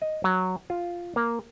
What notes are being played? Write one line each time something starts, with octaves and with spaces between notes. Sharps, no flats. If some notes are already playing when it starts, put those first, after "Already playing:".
D#5
F#3
F4
A#3